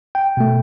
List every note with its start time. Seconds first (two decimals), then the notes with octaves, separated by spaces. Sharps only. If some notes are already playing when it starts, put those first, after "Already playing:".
0.15 G5
0.37 B2 A3